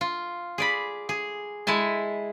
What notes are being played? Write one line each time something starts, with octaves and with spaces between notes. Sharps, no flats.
F4
G#4 D5 B5
G#4
G#3 E4 G#5 A5